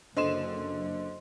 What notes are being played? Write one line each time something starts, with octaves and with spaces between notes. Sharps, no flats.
F#1 D3 C5 D#5 C6 E7